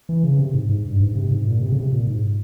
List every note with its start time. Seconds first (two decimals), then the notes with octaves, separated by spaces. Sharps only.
0.09 E3
0.24 C#3
0.39 C3
0.54 G#2
0.69 G#2
0.86 G2
1.00 G#2
1.15 C3
1.31 G#2
1.47 A#2
1.61 C3
1.72 C#3
1.77 C3
1.93 A#2
2.07 G#2